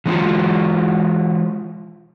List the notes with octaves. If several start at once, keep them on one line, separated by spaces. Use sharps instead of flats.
E3 G#3 C4 D#4 F4 F#4